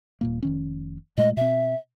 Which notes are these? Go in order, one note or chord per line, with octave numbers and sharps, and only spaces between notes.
D#1 A#2 A#3
F1 D#3 C#4
A#2 G#3 A3 D#5
B2 C4 E5